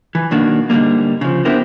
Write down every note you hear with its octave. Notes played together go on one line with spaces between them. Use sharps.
E3
B1 D#3 A#3 D4 F#4
G#2 D3 E3 G3 A#3
C#3 F3
B3 D4 E4 G4 A#4 C5